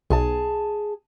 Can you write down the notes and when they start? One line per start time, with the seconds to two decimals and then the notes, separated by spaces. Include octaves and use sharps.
0.10 B1 G#4 A5